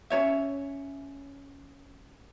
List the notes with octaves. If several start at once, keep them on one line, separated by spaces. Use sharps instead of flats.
C#4 D4 C#5 E5